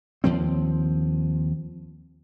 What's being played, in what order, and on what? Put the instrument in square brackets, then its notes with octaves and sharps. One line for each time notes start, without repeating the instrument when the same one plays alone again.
[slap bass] D#2 F3 C4